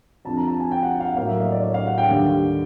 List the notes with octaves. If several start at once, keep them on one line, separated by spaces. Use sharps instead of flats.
F2 D3 F3 A5
A#5
A5
G#5
G5
F#5
F5
F#5
A2 F#3 A#3 F5
E5
D#5
D5
C#5
F5
F#5
G5
D#2 D3 G3